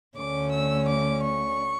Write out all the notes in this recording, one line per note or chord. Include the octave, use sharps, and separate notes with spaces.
D2 D3 A3 C#4 D6
E6
D6
C#6